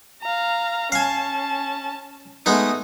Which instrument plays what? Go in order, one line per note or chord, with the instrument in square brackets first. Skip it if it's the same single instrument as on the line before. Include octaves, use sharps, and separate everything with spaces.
[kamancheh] F5 A#5
[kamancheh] C#4 A5 [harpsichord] F5 G#5
[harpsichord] G#3 B3 D#4 [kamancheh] A3 D#6